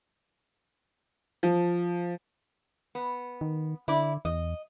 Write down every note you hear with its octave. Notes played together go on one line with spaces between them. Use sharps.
F3
B3
D#3
D3 E4 D5
E2 D#5